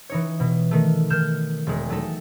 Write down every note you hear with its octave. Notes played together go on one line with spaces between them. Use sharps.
E3 D#4 C#5
B2
D#3 A3
D#3 F6 G6 E7
E1 G#3
F#3 A3 D#4 A4